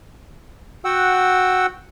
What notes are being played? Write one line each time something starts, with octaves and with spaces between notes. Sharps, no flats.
F#4 F#5 G5 E6